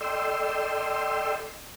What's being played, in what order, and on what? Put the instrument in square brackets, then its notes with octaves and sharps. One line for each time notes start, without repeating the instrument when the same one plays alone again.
[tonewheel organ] A4 D5 D#5 G5 C6 E6